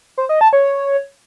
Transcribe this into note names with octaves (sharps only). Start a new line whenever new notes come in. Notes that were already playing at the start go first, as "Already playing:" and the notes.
C5
D#5
A5
C#5